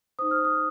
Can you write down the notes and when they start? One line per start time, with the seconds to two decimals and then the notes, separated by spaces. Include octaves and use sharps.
0.19 D#4 C5 D#6
0.31 F6
0.45 D#6